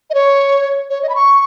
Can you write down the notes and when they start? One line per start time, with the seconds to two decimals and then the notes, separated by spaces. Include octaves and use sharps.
0.10 D#5
0.14 C#5
0.90 C#5
1.03 D#5
1.09 B5
1.15 C#6